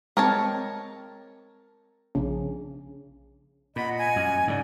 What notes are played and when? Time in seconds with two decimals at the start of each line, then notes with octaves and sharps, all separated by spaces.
0.17 G#3 C4 A#4 C#5 A5
2.15 A#1 C#3
3.76 A#2 D#5 F#5 B5
3.98 G#5
4.16 F#2
4.48 G#2 C#3 D5